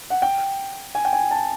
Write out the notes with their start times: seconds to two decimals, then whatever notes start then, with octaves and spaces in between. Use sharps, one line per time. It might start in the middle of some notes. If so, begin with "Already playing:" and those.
0.10 F#5
0.22 G5
0.95 G#5
1.05 G5
1.13 G#5
1.31 A5